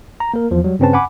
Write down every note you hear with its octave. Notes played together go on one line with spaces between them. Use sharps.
A#5
A#3 A#4
E2 F3
F#3 G3
G2 C#3 C4 C#4 B4 A5
F#5 G#5 B5 D6